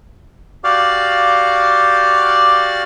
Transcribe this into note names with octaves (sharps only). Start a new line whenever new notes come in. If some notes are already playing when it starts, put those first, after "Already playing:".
F#4 G4 D5 F5